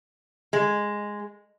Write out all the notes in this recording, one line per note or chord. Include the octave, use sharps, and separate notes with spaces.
G#3